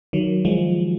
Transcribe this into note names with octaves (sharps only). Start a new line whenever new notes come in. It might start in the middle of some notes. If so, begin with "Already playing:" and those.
D#3 F#3
F3 G#3